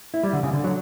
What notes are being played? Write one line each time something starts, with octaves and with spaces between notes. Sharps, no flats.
E4
G3
D3
C#3
D3
F#3